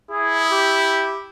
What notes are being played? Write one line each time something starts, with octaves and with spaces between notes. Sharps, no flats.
E4 G#4
G4